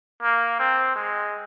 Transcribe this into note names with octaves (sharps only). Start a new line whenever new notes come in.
A#3
C4
G#3